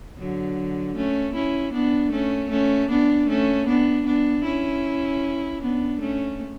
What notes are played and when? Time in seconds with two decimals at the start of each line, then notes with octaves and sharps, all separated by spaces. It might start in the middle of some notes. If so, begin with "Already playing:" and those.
0.18 D3 F#3
0.96 A3 C#4
1.35 C#4 E4
1.73 B3 D4
2.12 A3 C#4
2.51 A3 C#4
2.90 B3 D4
3.29 A3 C#4
3.68 B3 D4
4.06 B3 D4
4.45 C#4 E4
5.62 B3 D4
6.00 A3 C#4